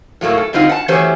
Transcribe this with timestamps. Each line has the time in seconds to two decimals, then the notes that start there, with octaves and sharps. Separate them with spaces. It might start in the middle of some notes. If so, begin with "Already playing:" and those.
0.21 A2 F#3 A3 A#3
0.37 A4
0.53 D3 G3 C4 D#4 F4 F#4
0.69 F#5 A5
0.88 E3 F#3 A3 C#4 G4 C5